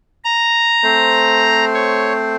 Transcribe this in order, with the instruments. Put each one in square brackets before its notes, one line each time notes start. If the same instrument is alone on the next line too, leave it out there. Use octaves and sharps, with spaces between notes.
[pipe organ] A#5
[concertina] A3 C4 C5
[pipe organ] C#5